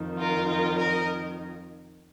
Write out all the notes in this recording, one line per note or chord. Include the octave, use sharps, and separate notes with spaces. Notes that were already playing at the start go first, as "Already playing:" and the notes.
Already playing: F2 D#3
F4 A#4
F4 A#4
A#4 D#5